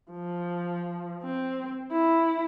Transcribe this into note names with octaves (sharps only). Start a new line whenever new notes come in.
F3
C4
E4